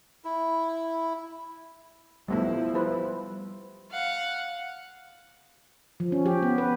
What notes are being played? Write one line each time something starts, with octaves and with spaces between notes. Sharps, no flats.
E4
F3 G3 A3 B3 E4
G3 B4 C5
F5 F#5
F3
C#4
G4
B3
B4